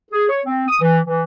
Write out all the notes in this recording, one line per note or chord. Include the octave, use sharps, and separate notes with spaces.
G#4
C#5
C4
D#6
E3
E3